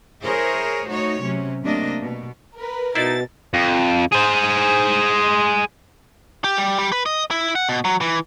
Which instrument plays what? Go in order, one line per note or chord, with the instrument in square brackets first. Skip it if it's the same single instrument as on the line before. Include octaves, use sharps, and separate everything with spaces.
[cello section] E4 G#4 A#4 C5 C#5
A3 D#4 F#4 C#5
C3 F#3 C#4
C3 A3 A#3 D4 D#5
B2
[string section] A#4 B4
[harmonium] B2 [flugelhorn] D#4 [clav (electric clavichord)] E4 C5 D5 [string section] A6
[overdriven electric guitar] F2
G#4 C5
[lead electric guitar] G4
G3
G3
B4
D#5
E4
F#5
B2
F#3
E3